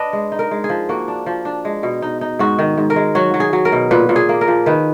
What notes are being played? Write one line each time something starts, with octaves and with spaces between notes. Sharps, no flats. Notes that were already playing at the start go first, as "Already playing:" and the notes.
Already playing: D4 B4 D#5
G#3
D#4
A#4
G#3
G#4
F3
A#3 F#4
D4
F3
D4
G#3
B2
D#4
D#4
G#2 F#4
D#3
G#2
A#4
G#3
F#3 F#4
F#3
G#4
F#3
A#4
B2
A#2 B4
A#2
G#4
A#3
A#4
F3
D#3 B4